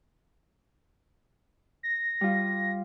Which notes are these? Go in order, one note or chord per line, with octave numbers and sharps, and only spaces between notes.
A#6
G3 F4